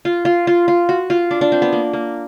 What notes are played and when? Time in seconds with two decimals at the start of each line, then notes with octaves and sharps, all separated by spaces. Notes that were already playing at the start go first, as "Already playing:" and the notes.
0.05 F4
0.25 F4
0.47 F4
0.68 F4
0.89 F#4
1.10 F4
1.31 D4
1.41 D4
1.52 C4
1.62 B3
1.73 A#3
1.93 A#3